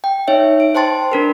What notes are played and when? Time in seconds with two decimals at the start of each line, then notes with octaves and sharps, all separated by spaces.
0.04 G5
0.28 D#4 C#5 E5
0.60 D7
0.75 C5 G5 A5 C6 A6
1.12 D4 A#4 B4